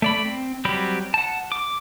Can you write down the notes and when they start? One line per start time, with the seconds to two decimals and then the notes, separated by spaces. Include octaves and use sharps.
0.02 A3 D5 B5
0.25 C4
0.65 F#3 G3 C4 G4 B5
1.14 F#5 A5
1.52 D6